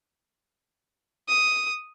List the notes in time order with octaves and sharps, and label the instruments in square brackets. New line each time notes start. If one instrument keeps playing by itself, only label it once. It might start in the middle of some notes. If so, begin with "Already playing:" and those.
[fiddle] D#6